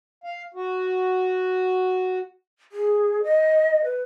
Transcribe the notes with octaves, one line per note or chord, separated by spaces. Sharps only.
F5
F#4
G#4
D#5
B4